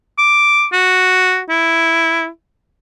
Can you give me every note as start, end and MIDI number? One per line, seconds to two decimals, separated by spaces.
0.19 0.65 86
0.73 1.40 66
1.50 2.28 64